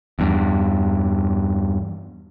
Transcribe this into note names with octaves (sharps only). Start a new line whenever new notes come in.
E2 G2